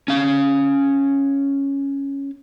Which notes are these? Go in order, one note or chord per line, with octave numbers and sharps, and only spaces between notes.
C#4 F5